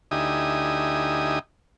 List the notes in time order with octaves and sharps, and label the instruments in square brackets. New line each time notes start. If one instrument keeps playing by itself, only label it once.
[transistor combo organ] D2 D#4 E4 G4 G#5 D#6